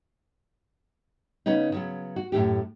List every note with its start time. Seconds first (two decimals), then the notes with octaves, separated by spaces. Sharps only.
1.46 C#3 B3 C#4 D#4
1.72 C#3 F#3 B3
2.16 F#4
2.32 F#2 A2 A3 G4